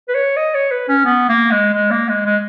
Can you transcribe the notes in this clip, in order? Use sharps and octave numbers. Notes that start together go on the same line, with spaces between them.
B4
C#5
D#5
C#5
B4
C#4
B3
A#3
G#3
G#3
A#3
G#3
G#3